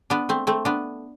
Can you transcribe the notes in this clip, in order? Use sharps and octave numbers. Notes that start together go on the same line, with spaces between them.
B3 D4
A3 C4
A3 C4
B3 D4